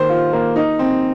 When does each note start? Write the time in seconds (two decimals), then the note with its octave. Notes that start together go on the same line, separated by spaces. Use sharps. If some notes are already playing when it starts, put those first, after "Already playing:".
Already playing: D#3 A#3 C5
0.09 F4
0.33 A#3
0.56 D#4
0.79 C4